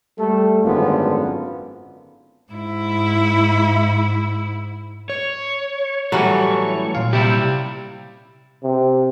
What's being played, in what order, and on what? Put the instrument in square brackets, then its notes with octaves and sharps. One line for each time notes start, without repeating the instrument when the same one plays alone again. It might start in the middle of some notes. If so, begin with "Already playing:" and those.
[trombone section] G3 A3 A4
G#1 F#2 D3 B3 C#4 F4
[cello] G#2 E4
[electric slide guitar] C#5
[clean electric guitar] A2 E3 A3 [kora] F#3 G3 C#4 [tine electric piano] A4
[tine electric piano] A#2 F5
[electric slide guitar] C3 G4 [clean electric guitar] G3 E4
[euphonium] C3